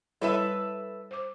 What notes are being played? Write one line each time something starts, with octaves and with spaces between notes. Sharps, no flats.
G3 E4 A4 B4 C#5 E5
C5 D6